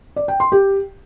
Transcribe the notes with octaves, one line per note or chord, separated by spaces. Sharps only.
D5
G5
C6
G4